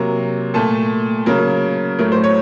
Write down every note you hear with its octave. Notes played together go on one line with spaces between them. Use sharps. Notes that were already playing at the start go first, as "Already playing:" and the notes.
Already playing: C3 F#3 A#3 A#5
A#2 A3 A5
C#3 F#3 A#3 A#4
A2 F#3 A3 A#4
C5
C#5